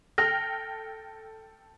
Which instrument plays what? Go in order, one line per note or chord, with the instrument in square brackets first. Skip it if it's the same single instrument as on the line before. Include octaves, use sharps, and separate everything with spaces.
[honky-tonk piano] A4 G5 F6 [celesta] A#6